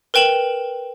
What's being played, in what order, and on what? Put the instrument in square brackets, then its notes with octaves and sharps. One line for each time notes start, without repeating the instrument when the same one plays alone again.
[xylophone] A#4 B4 G5 E7 F#7